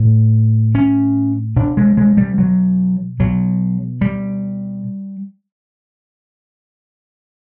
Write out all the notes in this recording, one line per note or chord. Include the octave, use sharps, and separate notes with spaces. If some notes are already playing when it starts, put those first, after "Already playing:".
Already playing: A2
C#4
B2 D4
G#3
G#3
G3
F#3
B2 F#3
G3